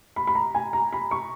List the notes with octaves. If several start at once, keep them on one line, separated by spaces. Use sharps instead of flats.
B5
B5
A#5
G#5
A#5
B5
C#6